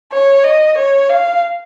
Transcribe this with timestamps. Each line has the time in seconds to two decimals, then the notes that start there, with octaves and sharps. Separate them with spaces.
0.12 C#5
0.44 D#5
0.77 C#5
1.09 F5